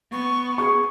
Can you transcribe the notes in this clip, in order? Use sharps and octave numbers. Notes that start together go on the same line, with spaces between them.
B3 C#6
G#4 C#6